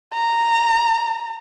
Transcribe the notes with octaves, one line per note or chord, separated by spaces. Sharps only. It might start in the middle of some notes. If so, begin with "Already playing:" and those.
A#5